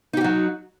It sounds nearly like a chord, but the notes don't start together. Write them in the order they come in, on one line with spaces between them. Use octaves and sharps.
D#4 G4 F#4 F#3